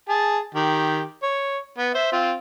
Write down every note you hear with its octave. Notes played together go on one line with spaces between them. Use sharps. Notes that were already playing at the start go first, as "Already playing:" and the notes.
G#4 A5
D#3 G4
C#5
B3
C5 E5
C4 F4